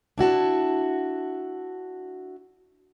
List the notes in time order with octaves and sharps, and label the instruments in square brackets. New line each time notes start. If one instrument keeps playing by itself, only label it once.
[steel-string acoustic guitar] D4 E4 F#4 A5